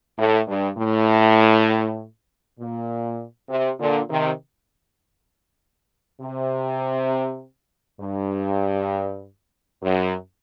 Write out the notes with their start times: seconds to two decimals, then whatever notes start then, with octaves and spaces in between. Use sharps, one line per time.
0.18 A2
0.48 G2
0.78 A2
2.59 A#2
3.49 C3
3.79 A#2 D3
4.10 C3 D#3
6.21 C3
8.01 G2
9.83 F#2